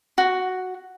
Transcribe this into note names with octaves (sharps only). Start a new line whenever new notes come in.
F#4